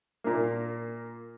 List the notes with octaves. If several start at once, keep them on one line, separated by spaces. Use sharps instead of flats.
A#2 A#3